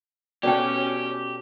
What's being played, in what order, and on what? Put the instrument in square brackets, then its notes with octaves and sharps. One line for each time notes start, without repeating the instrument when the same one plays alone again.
[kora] B2 A3 D4 [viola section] C#4 [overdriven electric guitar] G4 [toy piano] D5 G5